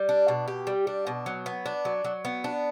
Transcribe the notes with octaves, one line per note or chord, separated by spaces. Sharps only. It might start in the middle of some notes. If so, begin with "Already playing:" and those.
Already playing: G3
D4
B2
G4
G3
D4
B2
F#3
B3
D4
F#3
F#3
B3
D4